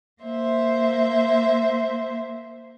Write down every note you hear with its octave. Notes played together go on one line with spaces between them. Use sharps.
A#3 C5 E5